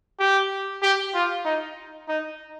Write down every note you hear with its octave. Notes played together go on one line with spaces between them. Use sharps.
G4
G4
F4
D#4
D#4